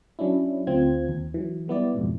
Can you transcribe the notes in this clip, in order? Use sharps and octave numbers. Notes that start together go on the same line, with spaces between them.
F#3 C#4 D4 E4
D2 C4 F4 G#6
D#2
E3 F#3
G3 B3 E4 D5
F2 G#2 B2